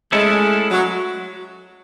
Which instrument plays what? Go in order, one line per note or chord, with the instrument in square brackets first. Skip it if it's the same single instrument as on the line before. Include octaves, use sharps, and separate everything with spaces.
[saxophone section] G#3 [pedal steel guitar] A3 C#4 E4 A4
[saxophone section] F#3